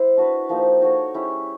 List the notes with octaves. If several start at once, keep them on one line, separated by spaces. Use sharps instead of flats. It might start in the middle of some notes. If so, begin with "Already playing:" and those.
Already playing: E4 C5
D4 F#4 B4
F3 A#3 D#4 G4
D#4 F#4 A4 C#5
G#3 C#4 E4 G4